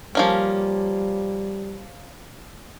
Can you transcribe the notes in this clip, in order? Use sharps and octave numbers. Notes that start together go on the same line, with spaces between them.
F3 G3 A#3 C#4